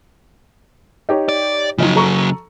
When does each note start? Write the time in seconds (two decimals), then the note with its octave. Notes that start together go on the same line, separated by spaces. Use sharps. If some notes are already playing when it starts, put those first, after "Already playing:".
1.09 D#4 G4 C#5
1.29 D5
1.78 C#3 F3 F#3 D#4 F4
1.96 A4 A#5 C#6